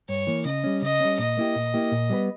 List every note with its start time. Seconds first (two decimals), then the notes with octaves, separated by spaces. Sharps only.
0.09 G2 C#5
0.27 E3 A#3
0.45 C#3 D#5
0.64 G3 C#4
0.82 C#3 D#5
1.01 G3 C#4
1.19 A#2 D#5
1.37 A#3 E4 G4
1.56 A#2
1.74 A#3 E4 G4
1.92 A#2
2.10 G3 B3 G4 B4